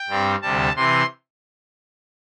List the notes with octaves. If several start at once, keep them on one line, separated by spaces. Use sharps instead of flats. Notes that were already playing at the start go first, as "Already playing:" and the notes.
Already playing: G5
G2 G3 C4
D2 C3 G3 A5
C3 E3 C4 C6